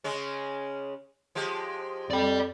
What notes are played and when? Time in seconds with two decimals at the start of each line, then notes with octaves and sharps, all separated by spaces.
0.04 C#3 G#3 C#4
1.35 F3 G#3 G4
2.11 F2 D5 G5